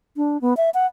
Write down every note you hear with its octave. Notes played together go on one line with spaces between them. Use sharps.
D4
B3
E5
F#5